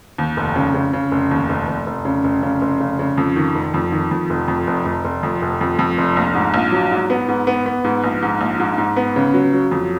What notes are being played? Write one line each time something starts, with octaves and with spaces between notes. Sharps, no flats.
D#2
F1
C#3
C#3
C#3
F1
D#2
F1
F1
F1
C#3
F1
C#3
F1
C#3
C#3
F2
D#3
F1
F2
D#3
F2
F1
F2
F1
F1
F1
F2
F1
F2
F2
F1
A#1
G#2
A#1
F#3
G#2
B3
G#2
B3
B3
G#2
A#1
G#2
A#1
G#2
G#2
B3
C#3
F#3
F#3
F2